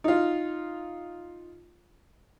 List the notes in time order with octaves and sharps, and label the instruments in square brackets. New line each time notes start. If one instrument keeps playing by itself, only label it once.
[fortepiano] D#4 F4